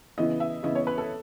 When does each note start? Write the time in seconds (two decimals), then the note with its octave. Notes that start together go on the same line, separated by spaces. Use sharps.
0.18 C#3 E3 B3 E4 D#5
0.40 E5
0.63 C#3 E3 B3 E4 D#5
0.75 C#5
0.87 B4
0.98 A4